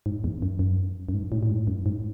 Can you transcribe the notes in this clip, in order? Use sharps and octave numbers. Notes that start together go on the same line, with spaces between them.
G#2
E2
F#2
F#2
F#2
G#2
A2
A2
G#2
F#2
G#2